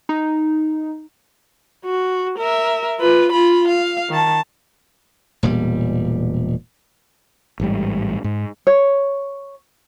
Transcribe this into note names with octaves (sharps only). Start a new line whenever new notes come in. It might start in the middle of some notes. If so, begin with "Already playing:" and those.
D#4
F#4
A#4 E5
F4 B4
F4 B5
F5
D#3 A5
E1 A#2 G3
A1 G#2 G3
G#2
C#5